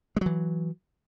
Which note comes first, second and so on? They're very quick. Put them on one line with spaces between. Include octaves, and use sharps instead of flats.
G#3 F#3 E3